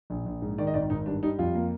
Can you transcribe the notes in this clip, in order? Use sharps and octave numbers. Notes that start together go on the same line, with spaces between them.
A#1
A#1
G#2
D#3 D5
D#5
G#1 D5
G#1 D#4
G2 D4
G3 D#4
F2 F4
A#3